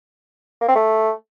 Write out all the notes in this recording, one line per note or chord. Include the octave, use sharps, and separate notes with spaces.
A#3
C4
A3